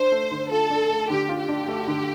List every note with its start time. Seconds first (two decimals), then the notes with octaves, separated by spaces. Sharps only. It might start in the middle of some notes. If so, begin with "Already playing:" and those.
Already playing: D4 C5
0.12 A3
0.31 D3
0.51 F4 A4
0.70 D4
0.90 A3
1.10 D3 G4
1.29 F4
1.39 G4
1.48 D4
1.68 A3
1.87 D3